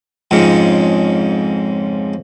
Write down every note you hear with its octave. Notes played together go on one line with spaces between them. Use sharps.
F2 G#2 C#3